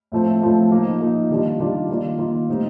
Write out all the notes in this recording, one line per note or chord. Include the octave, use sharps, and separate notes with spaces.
A2 F3 A3 C4
A2 F3 A3 C4
F3 A#3 D#4
F3 A#3 D#4
D#3 G3 D4 F4
D#3 G3 D4 F4
D#3 A#3 F4
D#3 A#3 F4
A2 G3 C4 D#4